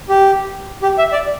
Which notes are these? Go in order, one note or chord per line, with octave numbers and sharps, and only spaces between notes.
G4
G4
E5
D5